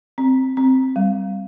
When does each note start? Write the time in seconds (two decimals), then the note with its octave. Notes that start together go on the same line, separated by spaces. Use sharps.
0.18 C4
0.57 C4
0.96 G3